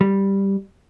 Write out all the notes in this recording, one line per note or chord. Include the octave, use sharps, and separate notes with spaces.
G3